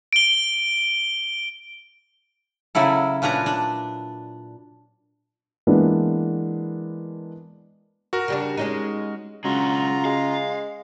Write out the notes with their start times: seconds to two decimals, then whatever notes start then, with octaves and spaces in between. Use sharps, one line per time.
0.13 D7 G7
2.75 C#3 F#3 C#4 E4 A4
3.22 A#2 C#4 D4 B4 A#5
3.46 D4
5.67 E3 G#3 A#3 B3 D4
8.13 F#4 A#4
8.28 C#3 G3 D4
8.57 G#3 C#4 D#4
9.44 C#3 F#3 G#3 D4 F4 A#5
10.05 G#3 F5